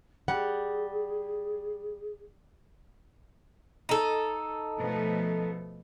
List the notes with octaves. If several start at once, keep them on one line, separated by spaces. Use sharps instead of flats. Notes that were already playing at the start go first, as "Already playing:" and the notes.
G3 G#4 F#5
D#4 A4
B2 F3 A3